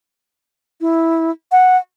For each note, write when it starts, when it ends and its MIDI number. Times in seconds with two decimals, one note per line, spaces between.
0.81 1.31 64
1.52 1.77 78